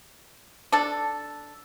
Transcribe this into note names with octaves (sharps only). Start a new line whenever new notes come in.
D4 A4